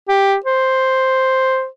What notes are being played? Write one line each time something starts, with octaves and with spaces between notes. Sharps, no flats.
G4
C5